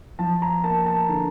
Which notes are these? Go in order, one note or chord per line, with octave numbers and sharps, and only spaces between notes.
F3 A5
A#5
A#3 A5
A5
D3